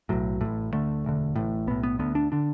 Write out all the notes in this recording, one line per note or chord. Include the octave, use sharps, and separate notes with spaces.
B1 A2 F#3
A1 A2
D2 D3 A3
E1 D2 D3
A1 A2
B1 A2 B3
B3
D2 D3 B3
D4
D3 D4